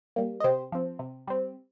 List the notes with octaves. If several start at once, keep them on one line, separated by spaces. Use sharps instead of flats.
G3 A#3
D#5
C3 G4 C5
F3 C4
C3
G3 C4